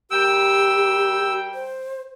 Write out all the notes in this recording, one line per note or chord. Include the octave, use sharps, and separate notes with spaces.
G3 G4 A#4 G5 E6
C5